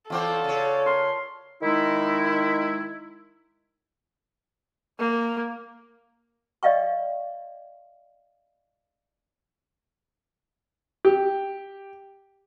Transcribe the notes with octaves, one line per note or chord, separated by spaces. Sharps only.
E2 C4 F4 A4 C5 D5 F#5
C#3 C#5
A#4 A5 C6
D#3 G#3 D#4 E4
A#3
D5 D#5 F5 G5 C#6
G4